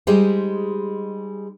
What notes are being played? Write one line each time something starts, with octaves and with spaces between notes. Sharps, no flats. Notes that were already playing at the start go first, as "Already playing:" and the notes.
G3 G#3 D#4 G4 G#4 C5